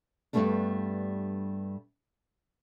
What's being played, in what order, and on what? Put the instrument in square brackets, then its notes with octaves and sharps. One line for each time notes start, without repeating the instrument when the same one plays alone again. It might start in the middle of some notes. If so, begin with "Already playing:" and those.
[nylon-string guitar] G2 C#3 G3 A3 B3 D4